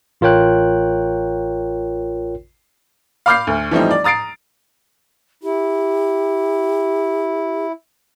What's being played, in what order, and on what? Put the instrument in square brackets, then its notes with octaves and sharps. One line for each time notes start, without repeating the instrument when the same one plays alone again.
[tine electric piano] A1 F4 A#4 C#5 G5 F#6
[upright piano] F5 B5 D6 F6 G6 C7
D2
E3 F3 G3 A3 C4 D#4
D5
A#5 D#6 A6 C7 D7
[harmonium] E4 [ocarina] G4